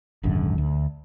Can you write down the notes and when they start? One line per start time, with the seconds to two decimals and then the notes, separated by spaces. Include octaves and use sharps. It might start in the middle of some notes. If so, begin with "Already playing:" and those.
0.23 D#1 G#1 F#2 D3
0.58 D2